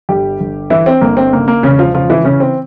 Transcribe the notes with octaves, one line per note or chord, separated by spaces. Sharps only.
G1 G3 G4
G1
E3 E4
C4
G1 A#3
C4
C#3 A#3
A#3
E1 C#3 C#4
F3 F4
C#3 F3 F4
E3 E4
C#3 E3 C#4
C4